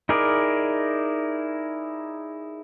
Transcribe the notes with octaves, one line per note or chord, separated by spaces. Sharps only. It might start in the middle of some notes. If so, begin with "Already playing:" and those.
D#4 E4 G#4 A#4 D5